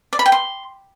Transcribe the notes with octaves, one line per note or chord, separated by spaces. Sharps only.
D5
B5
G5
C6